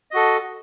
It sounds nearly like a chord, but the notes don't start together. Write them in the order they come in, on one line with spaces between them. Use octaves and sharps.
D#5 F#4 A4